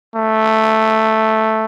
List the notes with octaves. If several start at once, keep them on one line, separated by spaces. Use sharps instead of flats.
A3